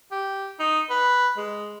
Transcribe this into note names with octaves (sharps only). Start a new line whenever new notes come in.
G4
D#4
B4
G#3